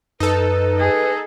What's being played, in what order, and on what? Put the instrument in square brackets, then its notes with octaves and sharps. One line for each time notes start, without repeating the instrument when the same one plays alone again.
[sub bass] F#2 [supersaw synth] D#4 A4 [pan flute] B4
[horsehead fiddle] G#4 D#5